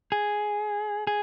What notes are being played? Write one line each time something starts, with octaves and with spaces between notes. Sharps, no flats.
G#4
G#4